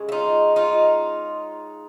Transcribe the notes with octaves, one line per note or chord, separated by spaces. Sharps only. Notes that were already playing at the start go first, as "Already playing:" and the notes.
Already playing: C#3 G#3
E4
D#4 F4
D#4 F4